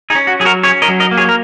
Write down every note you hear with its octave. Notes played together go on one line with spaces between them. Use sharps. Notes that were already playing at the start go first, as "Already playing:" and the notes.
D#4 G#4
C#4
F#4
F#3 G#4
F#4 A#4
C#4 G#4 C#5
A#4 D#5
F#3
A#4 D#5
A#3
G#4 C#5
A#4